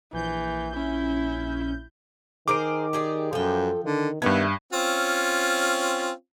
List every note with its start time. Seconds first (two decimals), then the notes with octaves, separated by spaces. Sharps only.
0.13 A#1 E3 G6
0.76 C#4 E4
2.48 D#3 G#4 A#4 C5 D6 D7
2.93 G4 G#4 D5
3.33 F#2 F3 A4 G5
3.85 D3 D#3
4.22 G2 D#3 A3 B3 G4 G#6
4.73 C4 C#4 F4